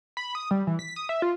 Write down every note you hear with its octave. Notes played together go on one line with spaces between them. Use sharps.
B5
D#6
G3
E3
B6
D#6
E5
F4